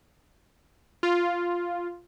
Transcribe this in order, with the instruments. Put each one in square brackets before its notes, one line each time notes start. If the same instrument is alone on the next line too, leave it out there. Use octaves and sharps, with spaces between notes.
[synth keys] F4